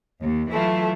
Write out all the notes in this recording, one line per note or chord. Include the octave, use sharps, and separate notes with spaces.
D#2
E3 F#3 A3 E4 F4